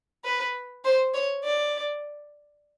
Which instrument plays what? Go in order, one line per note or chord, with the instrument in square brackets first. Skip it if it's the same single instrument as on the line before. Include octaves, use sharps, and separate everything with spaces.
[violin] B4
C5
C#5
D5